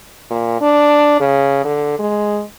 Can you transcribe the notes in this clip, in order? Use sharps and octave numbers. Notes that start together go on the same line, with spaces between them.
A#2
D4
C#3
D3
G#3